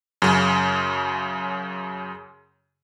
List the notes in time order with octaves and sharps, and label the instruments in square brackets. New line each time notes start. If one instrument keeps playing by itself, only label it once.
[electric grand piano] F#2 C#3